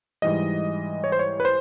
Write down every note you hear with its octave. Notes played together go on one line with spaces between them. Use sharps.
G#2 E3 G3 D#5
C#5
C5
C#5
B4
C5